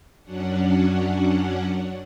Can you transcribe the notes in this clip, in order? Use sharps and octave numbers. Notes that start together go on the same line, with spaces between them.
F#2 F#3 C#4 D4 F#5